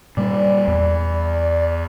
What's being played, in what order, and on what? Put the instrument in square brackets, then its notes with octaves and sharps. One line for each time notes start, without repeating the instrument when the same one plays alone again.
[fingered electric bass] A#2 G3 [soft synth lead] D5
[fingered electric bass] E2